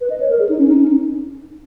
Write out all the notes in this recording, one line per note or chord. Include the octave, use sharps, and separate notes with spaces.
B4
D#5
C#5
A#4
G#4
D#4
C#4
D#4
C#4
D#4